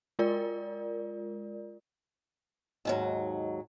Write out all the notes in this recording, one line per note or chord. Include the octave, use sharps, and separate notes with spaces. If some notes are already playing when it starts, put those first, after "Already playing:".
G#3 F4 A#4 D5
D#2 G#2 F#3